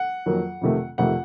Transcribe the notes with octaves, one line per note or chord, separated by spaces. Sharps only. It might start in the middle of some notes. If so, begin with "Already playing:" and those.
Already playing: F#5
F2 D#3 F#3 A#3
F2 C3 D#3 A3
F2 C3 D#3 A3 F#5